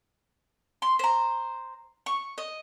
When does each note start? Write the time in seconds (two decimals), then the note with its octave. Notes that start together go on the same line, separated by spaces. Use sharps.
0.82 C6
0.99 C5 A#5
2.06 C#6
2.38 D#5